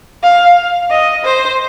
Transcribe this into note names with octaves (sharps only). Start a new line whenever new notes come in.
F5
D#5
C5